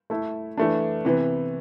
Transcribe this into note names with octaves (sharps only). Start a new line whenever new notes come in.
A3 E4 A4
E3 A3 D4
C3 E3 B3